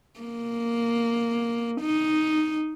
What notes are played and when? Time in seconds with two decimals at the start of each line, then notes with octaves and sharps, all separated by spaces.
0.20 A#3
1.81 D#4